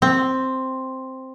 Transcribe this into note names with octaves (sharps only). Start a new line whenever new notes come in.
C4